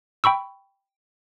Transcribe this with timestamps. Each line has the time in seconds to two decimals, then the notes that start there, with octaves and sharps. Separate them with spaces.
0.24 G5 B5 C#6 E6